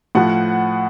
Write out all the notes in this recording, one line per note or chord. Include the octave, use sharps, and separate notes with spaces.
A2 F3 F#5